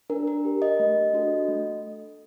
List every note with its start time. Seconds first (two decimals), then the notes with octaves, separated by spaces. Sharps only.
0.10 D4 A#4
0.27 A#4
0.45 G4
0.62 D#5
0.79 A3
1.13 D4 F#4 A4
1.48 A3